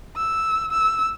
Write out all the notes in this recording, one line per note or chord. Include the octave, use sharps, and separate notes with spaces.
E6
E6